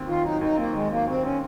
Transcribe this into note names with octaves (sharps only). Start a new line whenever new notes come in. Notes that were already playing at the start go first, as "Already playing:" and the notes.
Already playing: D#2 C4
D#3 F4
F#3 D#4
D#2 D#4
A#3 C4
D#3 G#3
F#3 A#3
D#2 C4
C4 C#4